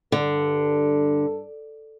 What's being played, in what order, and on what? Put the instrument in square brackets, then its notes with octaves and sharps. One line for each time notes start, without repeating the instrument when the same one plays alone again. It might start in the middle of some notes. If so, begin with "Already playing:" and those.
[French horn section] G2 A4 [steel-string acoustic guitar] D3